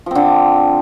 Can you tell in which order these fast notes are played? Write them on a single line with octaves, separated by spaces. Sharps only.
F3 C4 D3